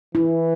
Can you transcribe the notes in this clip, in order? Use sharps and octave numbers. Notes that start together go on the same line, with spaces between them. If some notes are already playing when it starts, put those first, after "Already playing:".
E3 E4